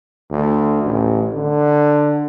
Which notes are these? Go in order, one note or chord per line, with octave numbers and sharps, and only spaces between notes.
D2
A1
D3